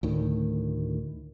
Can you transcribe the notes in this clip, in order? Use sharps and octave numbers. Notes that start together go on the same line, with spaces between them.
D2 A2 D#3